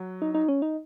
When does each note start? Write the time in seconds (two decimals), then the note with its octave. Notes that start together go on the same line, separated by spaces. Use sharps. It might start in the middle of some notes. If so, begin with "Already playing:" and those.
Already playing: F#3
0.22 D#4
0.35 D#4
0.49 C#4
0.62 D#4